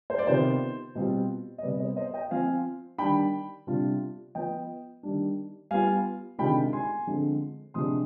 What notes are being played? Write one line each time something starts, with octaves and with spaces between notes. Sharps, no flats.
C5
D5
C3 D#3 B3 F4 C5
B2 G3 C4 F4
D#5
C3 G3 B3 B4 D5
C5 D#5
C5 D#5
D#5 G5
F3 C4 F4 F5 G#5
D#3 G3 D4 G5 B5
C3 G3 D4 F4
F3 B3 F4 D#5 G5
D#3 G3 D4
G3 B3 F4 F5 G#5
C3 D#3 G#3 D4 F4 G5 B5
G#5 C6
D3 F3 G#3 C4 F4
C3 F3 G#3 D4 F4 C6 D#6